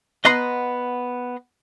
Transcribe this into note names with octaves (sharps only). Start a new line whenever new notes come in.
B3 D#5 F#5 A#5 C6